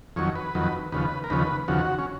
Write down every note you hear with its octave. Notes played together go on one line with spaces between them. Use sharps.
F2 D#3 F#3 C#5
B4
F2 D#3 F#3
D#2 C#3 F3 B4
A#4
D#2 C#3 F3 B4
D#2 C#3 F3 F#4
C#4